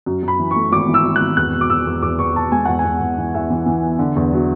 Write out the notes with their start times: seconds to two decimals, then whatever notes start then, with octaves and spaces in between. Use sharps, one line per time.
0.06 F#2
0.23 F#2
0.28 B5
0.39 E3
0.51 C#6
0.56 A3
0.72 G#1 D6
0.88 E3
0.94 E6
1.05 G#1
1.16 F#6
1.21 G#1
1.37 E2 F#6
1.54 B2
1.61 D6
1.70 E2 E6
1.87 E2
2.02 E2 D6
2.19 E2 C#6
2.36 B2 A5
2.52 G#3 G#5
2.65 E2 F#5
2.79 G#5
2.85 E2
3.01 E2
3.18 E3
3.35 E2 E5
3.50 E3
3.66 E3
3.83 B3
3.99 D3
4.16 E2
4.33 F#3